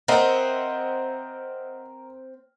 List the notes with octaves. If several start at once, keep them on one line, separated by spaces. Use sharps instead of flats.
C4 A#4 D#5 E5 F#5